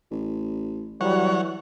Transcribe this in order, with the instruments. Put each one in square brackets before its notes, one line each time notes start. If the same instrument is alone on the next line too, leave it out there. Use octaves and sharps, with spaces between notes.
[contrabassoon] A1
[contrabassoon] E3 [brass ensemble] F#3 G3 [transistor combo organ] C#5 F#5